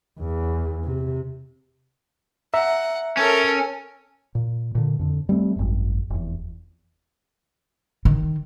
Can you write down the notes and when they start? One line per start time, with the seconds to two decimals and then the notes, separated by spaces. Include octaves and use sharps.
0.19 E2
0.84 C3
2.54 E5 F#5 A#5
3.17 C#4 A4 A#4
4.35 A#2
4.75 A#2 D3
4.99 F2 D3
5.29 G3 A3 C4
5.56 G#1 F#2
6.10 F1 E2
8.05 D#3